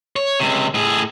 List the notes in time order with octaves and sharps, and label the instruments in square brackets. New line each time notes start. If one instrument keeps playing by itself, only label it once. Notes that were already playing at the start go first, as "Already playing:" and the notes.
[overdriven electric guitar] C#5
C#2 C3
A2 G#4